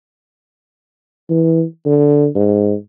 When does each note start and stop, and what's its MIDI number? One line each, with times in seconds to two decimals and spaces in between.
1.29 1.63 52
1.86 2.28 50
2.35 2.74 44